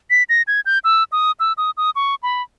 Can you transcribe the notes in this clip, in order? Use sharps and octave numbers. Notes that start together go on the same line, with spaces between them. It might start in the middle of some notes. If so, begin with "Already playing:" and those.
B6
A#6
G#6
G6
E6
D#6
E6
D#6
D#6
C#6
B5